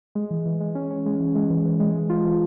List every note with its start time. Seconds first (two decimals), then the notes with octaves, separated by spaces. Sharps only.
0.15 G#3
0.31 E3
0.46 E3
0.60 G#3
0.75 C#4
0.91 C#4
1.06 G#3
1.20 E3
1.35 G#3
1.50 E3
1.65 E3
1.80 G#3
1.95 E3
2.10 F4
2.25 E3